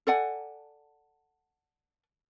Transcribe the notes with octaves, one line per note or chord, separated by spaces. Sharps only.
A4 D5 F#5 G#5